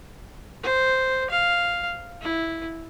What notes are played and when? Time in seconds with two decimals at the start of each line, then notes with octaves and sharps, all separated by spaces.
0.64 C5
1.30 F5
2.22 E4